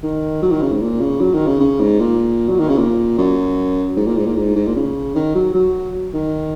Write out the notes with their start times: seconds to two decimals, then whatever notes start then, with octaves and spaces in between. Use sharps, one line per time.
0.03 D#3
0.42 F#3
0.51 D#3
0.62 C#3
0.72 G#2
0.81 A#2
1.01 C#3
1.21 F#3
1.34 D#3
1.47 C#3
1.60 C#3
1.80 G#2
2.00 A#2
2.49 F#3
2.59 D#3
2.69 C#3
2.78 A#2
3.18 F#2
3.97 G#2
4.06 A#2
4.16 G#2
4.26 A#2
4.36 G#2
4.56 G#2
4.67 A#2
4.76 C#3
5.15 D#3
5.35 F#3
5.54 F#3
6.14 D#3